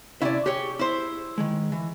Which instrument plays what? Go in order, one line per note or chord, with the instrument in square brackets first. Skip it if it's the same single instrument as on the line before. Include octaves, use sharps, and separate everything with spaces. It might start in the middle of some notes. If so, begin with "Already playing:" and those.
[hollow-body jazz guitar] C3 C#4 E5 [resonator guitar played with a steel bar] E4 D5
[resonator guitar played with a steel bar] G4 C#5 [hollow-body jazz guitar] G#4
[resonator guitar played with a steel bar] E4 C5
[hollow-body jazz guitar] D#3 G#3
E3